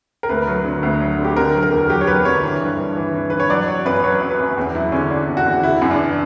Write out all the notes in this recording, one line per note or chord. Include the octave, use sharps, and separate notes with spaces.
A#4
D2 B4
F#3
D3
D2
F#3
D3
G4
D3 A#4
F#3
A#4
E2
F#3 G4
C#5
F#3 B4
D3 C#5
E3
G2
G2
E3
E3
E3 B4
C#5
F#3 D5
F#3 C#5
F#2 B4
F#3 C#5
F#2
B4
F#2
E2
F#3 E4
D3 C#4
D3 D4
E2
F#4
E2
C#3 E4
F#2
D4
E3